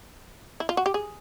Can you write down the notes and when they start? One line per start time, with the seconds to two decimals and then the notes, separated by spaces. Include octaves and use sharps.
0.60 E4
0.69 F4
0.77 F#4
0.86 G4
0.94 G#4